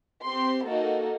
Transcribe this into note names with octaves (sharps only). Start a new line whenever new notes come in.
C4 G4 C6
A#3 D#4 F#4 A4